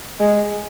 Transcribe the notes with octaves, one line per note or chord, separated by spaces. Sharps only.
G#3